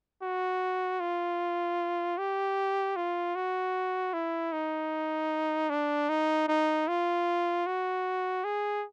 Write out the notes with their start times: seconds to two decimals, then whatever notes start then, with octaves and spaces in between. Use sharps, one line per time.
0.22 F#4
1.00 F4
2.18 G4
2.96 F4
3.35 F#4
4.14 E4
4.53 D#4
5.70 D4
6.09 D#4
6.48 D#4
6.88 F4
7.66 F#4
8.44 G#4